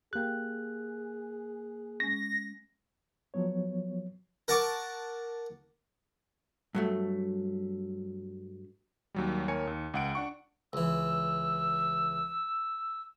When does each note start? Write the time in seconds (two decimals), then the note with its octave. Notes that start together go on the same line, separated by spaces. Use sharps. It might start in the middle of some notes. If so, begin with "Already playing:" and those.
0.13 A#3 G4 G#4 G5 F#6
2.00 G#3 C#4 A#6
3.34 F3 F#3 B3 C#5
4.48 A#4 F#5 A5 C#6 D6
6.75 G2 F#3 A3
9.15 D#2 F#3 G3
9.48 D#2 A#4 C#5 G#5 C#7
9.67 D#2
9.94 C#2 F#5 D7
10.15 D4 F#5 C#6
10.73 C#2 E3 E6